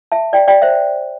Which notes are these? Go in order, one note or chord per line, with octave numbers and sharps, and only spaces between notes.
E5 A5
D5 G5
D5 G5
C5 E5